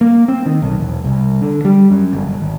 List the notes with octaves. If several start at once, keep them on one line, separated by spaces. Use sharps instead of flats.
A#3
C4
D#3
B1
E1
C2
D3
G3
F#2
G1
G1
G#1